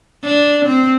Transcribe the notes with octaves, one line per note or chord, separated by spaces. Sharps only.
D4
C4